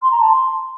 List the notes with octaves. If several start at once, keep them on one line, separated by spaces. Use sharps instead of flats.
C6
A#5
A5
C6